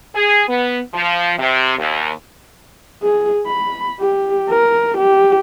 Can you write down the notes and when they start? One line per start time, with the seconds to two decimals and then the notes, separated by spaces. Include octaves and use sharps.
0.14 G#4
0.48 B3
0.93 F3
1.38 C3
1.78 D#2
3.03 G#4
3.46 B5
4.01 G4
4.49 A#4
4.97 G4